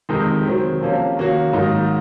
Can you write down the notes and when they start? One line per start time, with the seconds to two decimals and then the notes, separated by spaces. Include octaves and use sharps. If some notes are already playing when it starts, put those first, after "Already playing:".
0.09 F2 C3 D#3 G#3 D#4
0.46 D#3 F#3 C4
0.81 C3 F3 A#3 C#4
1.17 D#3 A#3 C#4 F#4
1.53 G#2 D#3 F#3 A#3 D#4